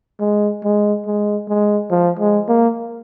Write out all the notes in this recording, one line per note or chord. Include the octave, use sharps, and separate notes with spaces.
G#3
G#3
G#3
G#3
F3
G#3
A#3